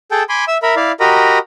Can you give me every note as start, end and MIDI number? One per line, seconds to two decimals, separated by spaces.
0.11 0.23 68
0.11 0.23 69
0.11 0.23 79
0.11 0.23 81
0.29 0.45 80
0.29 0.45 83
0.29 0.45 84
0.29 0.45 86
0.48 0.58 76
0.48 0.58 88
0.62 0.75 70
0.62 0.75 76
0.62 0.75 83
0.76 0.92 64
0.76 0.92 74
0.76 0.92 77
1.00 1.39 66
1.00 1.39 67
1.00 1.39 70
1.00 1.39 75
1.00 1.39 82
1.00 1.39 83